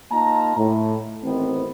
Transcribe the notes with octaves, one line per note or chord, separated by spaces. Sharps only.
A#3 D#4 F4 A5 A#5
A2
A1 D#3 B3 C4